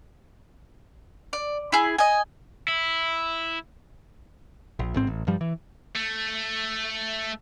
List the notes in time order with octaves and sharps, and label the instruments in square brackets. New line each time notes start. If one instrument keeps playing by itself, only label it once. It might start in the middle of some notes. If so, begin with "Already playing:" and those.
[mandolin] D5
E4 G#4
D#5 G#5
[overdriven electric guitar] E4
[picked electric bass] A#1
A1 G#2 C4
A1
G2 F3 G3
E3
[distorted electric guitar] A3